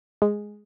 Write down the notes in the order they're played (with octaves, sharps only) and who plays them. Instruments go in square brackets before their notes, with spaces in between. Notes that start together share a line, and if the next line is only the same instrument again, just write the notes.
[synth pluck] G#3